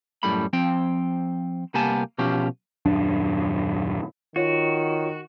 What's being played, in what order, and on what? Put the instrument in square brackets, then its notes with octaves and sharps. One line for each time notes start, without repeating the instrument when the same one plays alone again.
[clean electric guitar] F#2 A2 G3 B5
F3 C4 G5
C2 A#3 B3 G4 G#5 A5
B2 F3 C#4 G4
[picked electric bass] D#1 F#2 D4
[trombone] D#3 [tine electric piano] F4 C#5 [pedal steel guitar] F#4